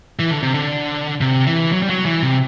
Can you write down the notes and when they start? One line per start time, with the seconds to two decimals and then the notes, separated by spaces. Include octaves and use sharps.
0.19 E3
0.31 D3
0.43 C3
0.54 D3
1.21 C3
1.47 E3
1.72 F#3
1.82 G3
1.90 F#3
2.06 E3
2.23 C3